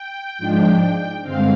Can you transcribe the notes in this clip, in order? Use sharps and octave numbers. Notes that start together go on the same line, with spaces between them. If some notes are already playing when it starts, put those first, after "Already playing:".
Already playing: G5
G#2 F3 G#3 D4
G2 D3 G#3 C4 F5